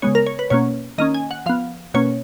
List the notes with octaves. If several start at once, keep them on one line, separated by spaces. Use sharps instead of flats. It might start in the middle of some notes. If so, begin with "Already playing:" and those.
C#3 G#3 B3 C#5
A#4
C#5
B4
B2 A#3 C#4 C#5
D#3 A#3 C#4 D#5
G#5
F#5
F3 B3 F5
B2 A#3 C#4 C#5